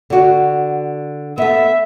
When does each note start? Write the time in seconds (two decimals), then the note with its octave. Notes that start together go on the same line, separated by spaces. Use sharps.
0.10 D3 F#4
1.38 A3 B3 E5